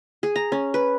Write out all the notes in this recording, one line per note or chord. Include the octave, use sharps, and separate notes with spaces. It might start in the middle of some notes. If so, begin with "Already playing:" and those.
G#4
A#5
C#4
B4